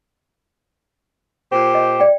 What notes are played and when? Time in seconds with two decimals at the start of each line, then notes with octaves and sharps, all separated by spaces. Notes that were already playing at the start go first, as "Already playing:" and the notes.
1.50 A#2 G4 C5
1.75 D#5
2.00 D5 G5